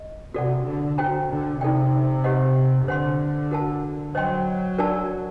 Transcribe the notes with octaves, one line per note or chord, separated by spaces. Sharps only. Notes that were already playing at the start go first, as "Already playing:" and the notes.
Already playing: D#5
C3 F#4 A4 D5 F#5
D3
F#4 C5 G5 A#5
D3
C3 D#4 A4 D5 G5
G4 C5 D#5 F#5
D3 C5 F#5 C6
F#4 A#4 F#5 A5
F#3 C5 D#5 G5 C6
D4 F#4 A#4 D5 A5